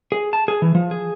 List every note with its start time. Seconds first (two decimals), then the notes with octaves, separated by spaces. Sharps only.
0.12 G#4
0.33 A5
0.48 G#4
0.62 E3
0.75 F3
0.91 G#4